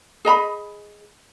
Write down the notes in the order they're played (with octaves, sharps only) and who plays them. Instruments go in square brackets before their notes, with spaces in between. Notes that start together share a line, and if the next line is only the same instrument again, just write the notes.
[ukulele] G#4 D#5 A#5 B5